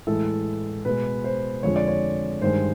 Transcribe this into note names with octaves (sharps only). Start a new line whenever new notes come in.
A2 E3 G#3 A4
B2 G#3 B4
C5
F2 D3 F3 G#3 C#5
D5
C#5
G2 D#3 G#3 C5